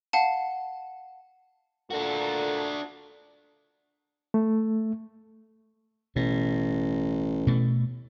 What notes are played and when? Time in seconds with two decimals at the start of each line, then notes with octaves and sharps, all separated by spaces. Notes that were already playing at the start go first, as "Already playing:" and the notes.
0.13 F5 F#5 A5
1.91 A#2 D4 F#4 A4
4.34 A3
6.16 A1 B2
7.47 B2 A3